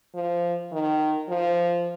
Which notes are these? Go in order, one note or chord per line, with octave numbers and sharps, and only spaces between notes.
F3
D#3
F3